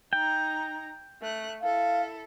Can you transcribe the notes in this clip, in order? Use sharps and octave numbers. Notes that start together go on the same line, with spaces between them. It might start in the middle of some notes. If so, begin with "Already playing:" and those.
D#4 G5 A#5
A3 F#6
E4 A4 F5